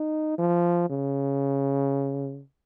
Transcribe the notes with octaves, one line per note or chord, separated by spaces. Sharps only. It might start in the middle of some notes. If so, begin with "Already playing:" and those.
Already playing: D#4
F3
C#3